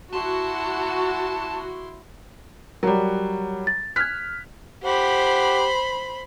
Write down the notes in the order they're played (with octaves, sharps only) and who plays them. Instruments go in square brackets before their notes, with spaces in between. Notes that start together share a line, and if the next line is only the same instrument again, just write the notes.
[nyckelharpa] E4 C6 [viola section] F#4 [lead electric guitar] A5
[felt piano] F#3 G3 [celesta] A#4
[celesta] A6
[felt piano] F6 B6 [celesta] F#6 G#6
[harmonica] G4 F#5 [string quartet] C5 B5